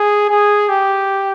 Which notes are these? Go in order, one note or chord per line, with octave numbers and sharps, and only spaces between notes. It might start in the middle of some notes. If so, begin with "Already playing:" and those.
Already playing: G#4
G#4
G4